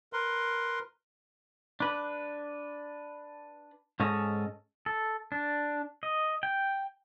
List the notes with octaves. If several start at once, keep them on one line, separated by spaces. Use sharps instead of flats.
A#4 B4 C6
D4 B4
G#2 C#4 A4 D#5
A4
D4
D#5
G5